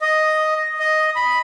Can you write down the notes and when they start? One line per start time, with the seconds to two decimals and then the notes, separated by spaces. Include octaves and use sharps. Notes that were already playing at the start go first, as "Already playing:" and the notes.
0.01 D#5
0.79 D#5
1.16 B5